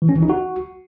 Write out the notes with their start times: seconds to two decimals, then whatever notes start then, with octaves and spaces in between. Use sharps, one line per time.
0.02 E3
0.09 C#4
0.16 E3
0.23 D#4
0.30 F#4